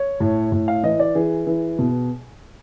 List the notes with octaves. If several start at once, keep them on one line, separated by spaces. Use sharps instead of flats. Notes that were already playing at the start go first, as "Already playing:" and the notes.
Already playing: C#5
A2
A2
F5
E3 D#5
D5
E3 G#4
E3
B2